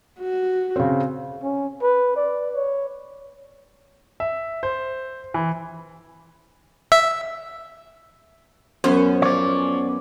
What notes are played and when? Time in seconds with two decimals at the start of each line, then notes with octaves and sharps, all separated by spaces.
0.19 F#4
0.76 C#3 C4
1.43 C#4
1.82 B4
2.16 D5
2.55 C#5
4.20 E5
4.63 C5
5.34 E3
6.92 E5
8.84 F#2 B3 C#4 C5
9.22 F3 C#5 D5